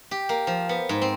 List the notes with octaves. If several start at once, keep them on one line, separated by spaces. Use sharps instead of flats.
G4
A#3
F3
B3
G#2
C4